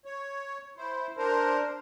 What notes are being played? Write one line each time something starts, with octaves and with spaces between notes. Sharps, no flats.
C#5
E4 C5
D4 A#4 C5